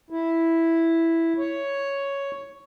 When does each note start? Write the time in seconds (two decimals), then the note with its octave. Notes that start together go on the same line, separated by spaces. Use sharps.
0.10 E4
1.38 C#5